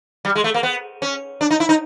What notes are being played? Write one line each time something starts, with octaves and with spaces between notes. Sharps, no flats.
G3
G#3
A3
A#3
B3
C#4
D4
D#4
E4
D#4